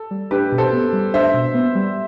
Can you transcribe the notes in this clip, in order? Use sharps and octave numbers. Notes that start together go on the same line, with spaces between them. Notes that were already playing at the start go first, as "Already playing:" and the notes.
Already playing: A4
G3
D4 G4 B4
B2
A4 C5
B3
G3
D4 C5 E5
B2
B3
G3